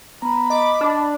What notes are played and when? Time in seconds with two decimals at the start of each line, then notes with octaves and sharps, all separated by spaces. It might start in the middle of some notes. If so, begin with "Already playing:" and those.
0.22 B3 A#5 B5
0.50 D#5 D6
0.81 D4